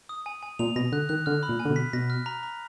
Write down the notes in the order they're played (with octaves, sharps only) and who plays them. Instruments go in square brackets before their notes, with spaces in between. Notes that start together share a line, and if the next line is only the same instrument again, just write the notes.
[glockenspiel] D#6
G#5
G#5
[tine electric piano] A#2 [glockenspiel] F7
[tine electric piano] B2 [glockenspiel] A#6
[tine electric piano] D3 [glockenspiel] F#6
[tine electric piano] D#3 [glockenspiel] F#6
[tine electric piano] D3 [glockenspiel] F6
[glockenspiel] B5
[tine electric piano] A#2
[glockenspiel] G#5
[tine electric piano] D3
B2
[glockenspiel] B6
[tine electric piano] B2 [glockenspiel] A#6
[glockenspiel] F6
A#5
A#5